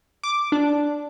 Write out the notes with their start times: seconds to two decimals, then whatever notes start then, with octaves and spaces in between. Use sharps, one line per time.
0.24 D6
0.52 D4